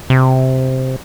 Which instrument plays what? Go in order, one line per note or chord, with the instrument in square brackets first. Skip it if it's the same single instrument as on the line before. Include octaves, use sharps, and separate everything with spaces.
[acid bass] C3